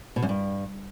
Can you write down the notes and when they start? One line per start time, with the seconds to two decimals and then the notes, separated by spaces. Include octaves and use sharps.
0.16 B2
0.23 F#2
0.29 G2